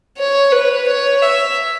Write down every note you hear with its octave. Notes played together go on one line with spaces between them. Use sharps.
C#5
B4
C#5
E5